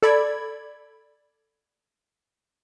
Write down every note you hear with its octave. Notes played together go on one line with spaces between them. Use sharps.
A4 D5 B5 G#6